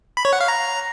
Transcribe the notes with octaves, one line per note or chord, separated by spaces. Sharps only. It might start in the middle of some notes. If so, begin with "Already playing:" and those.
B5
C#5
F#5
F5
A#5